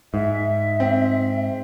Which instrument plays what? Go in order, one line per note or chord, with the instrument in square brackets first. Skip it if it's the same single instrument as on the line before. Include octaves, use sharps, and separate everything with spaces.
[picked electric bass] G#2 [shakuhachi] E5
[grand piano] C4